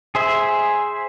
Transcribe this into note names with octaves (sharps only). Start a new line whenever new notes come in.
G#4 C5 E5